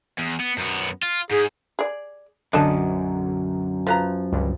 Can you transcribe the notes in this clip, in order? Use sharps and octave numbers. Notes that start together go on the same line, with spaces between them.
E2
B3
F#2 B3
F4
G#2 G#4
G#4 D5
B1 F#2 D3 D4 D#5 A5
F3 B4 A#5
C#2 G2 D3